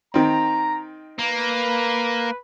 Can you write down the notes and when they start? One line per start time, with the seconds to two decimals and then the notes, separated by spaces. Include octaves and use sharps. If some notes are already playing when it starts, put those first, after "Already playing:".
0.14 D#3 C4 A#5
1.19 A#3 B4